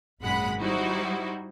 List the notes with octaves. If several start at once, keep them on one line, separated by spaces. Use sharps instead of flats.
G#1 F#2 A#2 G#3 F#5 B5
G3 D#4 E4 F#4 C5